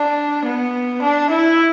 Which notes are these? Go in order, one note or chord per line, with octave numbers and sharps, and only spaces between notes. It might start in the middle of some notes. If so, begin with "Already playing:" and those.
Already playing: D4
B3
D4
E4